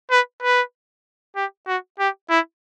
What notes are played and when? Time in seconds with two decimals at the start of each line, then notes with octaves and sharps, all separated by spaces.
0.11 B4
0.42 B4
1.36 G4
1.67 F#4
1.99 G4
2.30 E4